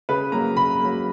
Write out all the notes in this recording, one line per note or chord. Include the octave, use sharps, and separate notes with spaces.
C#3 B4
F#3 A#3 A#5
C#3 B5
F#3 A#3